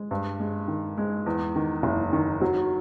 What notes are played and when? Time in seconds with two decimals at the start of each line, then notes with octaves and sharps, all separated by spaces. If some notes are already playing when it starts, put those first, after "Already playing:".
Already playing: G#3
0.11 G2
0.40 G#3
0.68 D#3
0.98 G#3
1.26 E2
1.56 D#3
1.83 F#1
2.13 D#3
2.41 F#3